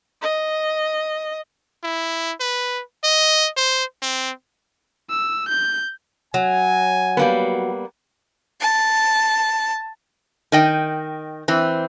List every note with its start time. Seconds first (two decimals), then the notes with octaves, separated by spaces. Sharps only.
0.22 D#5
1.84 E4
2.40 B4
3.04 D#5
3.57 C5
4.02 C4
5.10 E6
5.49 G6
6.34 F#3 G#5
7.17 G3 A#3 B3
8.62 A5
10.52 D#3 D#5 G5
11.48 E3 C4